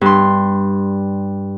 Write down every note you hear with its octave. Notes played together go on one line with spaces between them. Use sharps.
G2 C6